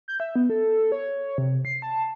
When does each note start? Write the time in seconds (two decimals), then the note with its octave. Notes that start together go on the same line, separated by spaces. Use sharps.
0.08 G6
0.20 E5
0.36 B3
0.50 A4
0.92 C#5
1.38 C3
1.65 C7
1.82 A5